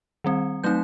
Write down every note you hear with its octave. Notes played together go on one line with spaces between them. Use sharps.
D#3 G3 C4
F#3 A3 C4 D#4 G6